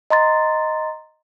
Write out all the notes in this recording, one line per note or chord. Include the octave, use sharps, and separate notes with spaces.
D#5 A#5 C6 A6